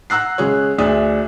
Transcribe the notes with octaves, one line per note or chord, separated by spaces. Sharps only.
F#5 A#5 E6 F#6 C7
C#3 G#3 G#4 C#5
D2 D4 G#4 E5 D#6